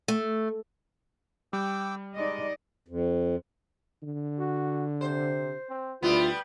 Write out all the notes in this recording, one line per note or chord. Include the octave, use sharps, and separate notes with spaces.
A3
G3 G5 D6 E6
G#3 D#4 D5 D#5
F2
D3
F#4
C3 C5
C4
D2 G3 B3 E4 F4